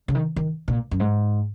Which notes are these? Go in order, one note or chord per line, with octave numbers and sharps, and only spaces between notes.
C#3
D#3
D#3
A#2
F#2
G#2